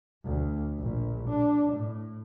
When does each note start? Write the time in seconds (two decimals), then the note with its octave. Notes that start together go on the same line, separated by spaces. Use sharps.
0.24 D2
0.79 A#1
1.29 D4
1.73 A2